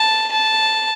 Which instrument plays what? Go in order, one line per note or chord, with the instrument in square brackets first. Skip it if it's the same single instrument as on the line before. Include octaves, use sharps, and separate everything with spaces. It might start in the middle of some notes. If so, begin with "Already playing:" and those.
Already playing: [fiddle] A5
A5